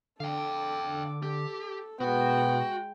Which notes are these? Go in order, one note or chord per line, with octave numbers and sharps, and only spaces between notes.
D3 A4 F5 G5 D6
G4 A4
B2 G#3 B3 F#4 G5